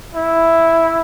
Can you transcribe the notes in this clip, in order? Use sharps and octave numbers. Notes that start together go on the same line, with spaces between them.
E4